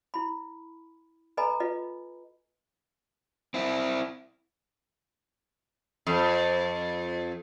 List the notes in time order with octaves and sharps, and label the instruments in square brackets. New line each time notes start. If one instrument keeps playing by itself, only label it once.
[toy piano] E4 B5
A4 B4 D#5 G#5 A#5 B5
F4 B4 D#5
[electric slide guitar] C4 E4
[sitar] F2